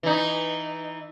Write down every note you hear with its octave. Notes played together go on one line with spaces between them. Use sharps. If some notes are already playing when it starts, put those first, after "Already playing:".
E3 D#4